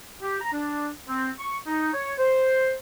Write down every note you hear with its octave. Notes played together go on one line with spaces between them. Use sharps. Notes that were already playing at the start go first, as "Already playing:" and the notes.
G4
A#5
D4
C4
C#6
D#4
C#5
C5